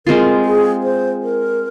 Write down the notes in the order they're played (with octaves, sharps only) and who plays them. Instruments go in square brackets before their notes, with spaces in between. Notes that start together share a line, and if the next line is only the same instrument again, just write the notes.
[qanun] G#3 C4 F4 [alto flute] A#4
[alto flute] G#4
C5
A#4